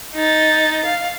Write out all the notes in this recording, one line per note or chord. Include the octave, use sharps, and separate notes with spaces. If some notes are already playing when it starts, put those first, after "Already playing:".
D#4 A6
F5